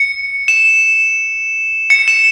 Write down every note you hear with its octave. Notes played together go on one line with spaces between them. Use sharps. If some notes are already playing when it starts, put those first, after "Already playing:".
Already playing: C#7
E7
C#7
E7